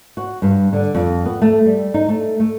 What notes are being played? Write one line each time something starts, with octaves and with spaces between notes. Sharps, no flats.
F#4
G2
D3
F2
B3
A3
G3
D#4
A3
A3